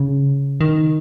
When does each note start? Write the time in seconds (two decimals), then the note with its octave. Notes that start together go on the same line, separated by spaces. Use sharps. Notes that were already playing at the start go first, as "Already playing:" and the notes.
Already playing: C#3
0.61 D#3